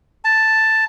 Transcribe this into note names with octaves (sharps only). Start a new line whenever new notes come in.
A5